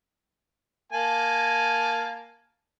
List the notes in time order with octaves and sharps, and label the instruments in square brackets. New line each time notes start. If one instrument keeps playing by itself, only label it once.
[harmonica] A#3 G#5 A5